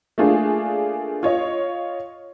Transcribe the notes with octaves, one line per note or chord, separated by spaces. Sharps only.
A3 A#3 D4 F4 G#4
F4 C#5 D#5